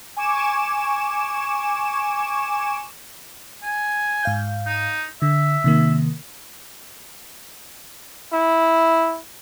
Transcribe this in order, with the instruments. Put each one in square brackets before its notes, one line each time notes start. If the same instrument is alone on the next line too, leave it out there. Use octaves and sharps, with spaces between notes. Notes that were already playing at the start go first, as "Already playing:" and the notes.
[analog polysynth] G#5 C#6 D6 E7
[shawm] G#5
[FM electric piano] G#2 F5 G6
[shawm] D#4
[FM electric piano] D3 [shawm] E5
[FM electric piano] C3 D#3 A#3
[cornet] E4